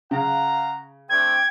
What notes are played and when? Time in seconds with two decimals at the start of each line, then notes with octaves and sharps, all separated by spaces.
0.11 C#3 F5 F#5 A#5
1.10 A3 C4 D4 G5 G#6